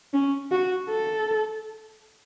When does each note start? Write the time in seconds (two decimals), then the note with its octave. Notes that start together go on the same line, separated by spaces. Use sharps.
0.14 C#4
0.51 F#4
0.90 A4